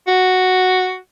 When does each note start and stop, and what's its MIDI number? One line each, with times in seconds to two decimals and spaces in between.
0.08 0.97 66